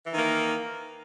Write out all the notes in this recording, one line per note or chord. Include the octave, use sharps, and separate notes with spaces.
D#3 E3 A#3